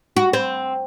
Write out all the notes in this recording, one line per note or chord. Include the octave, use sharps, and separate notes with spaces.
F#4
C4